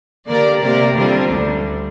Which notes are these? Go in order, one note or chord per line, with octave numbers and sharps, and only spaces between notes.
D3 A#3 G4 A#4 D5
C3 A#3 G4 A#4 D5
D3 G3 C4 F4 A#4
D2 D3 G3